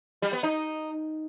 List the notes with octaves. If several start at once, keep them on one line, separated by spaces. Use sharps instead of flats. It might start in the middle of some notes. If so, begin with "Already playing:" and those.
G3
B3
D#4